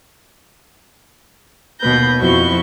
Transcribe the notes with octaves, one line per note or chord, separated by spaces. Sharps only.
D#2 B2 B4 G6 A#6
F2 E4 F#4 C#6 G6